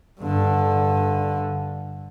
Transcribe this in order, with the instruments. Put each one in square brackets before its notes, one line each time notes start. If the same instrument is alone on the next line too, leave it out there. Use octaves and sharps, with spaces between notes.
[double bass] G2 D3